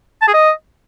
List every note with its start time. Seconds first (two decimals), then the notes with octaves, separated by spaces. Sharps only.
0.22 A5
0.28 G#4
0.34 D#5